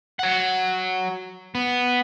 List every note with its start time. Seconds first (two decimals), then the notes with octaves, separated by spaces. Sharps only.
0.19 F#3 F#5
1.55 B3